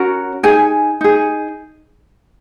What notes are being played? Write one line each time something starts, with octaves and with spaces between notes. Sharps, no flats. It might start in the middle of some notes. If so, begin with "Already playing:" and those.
Already playing: C#4 F#4 A#4
D#4 G#4 G#5
D#4 G#4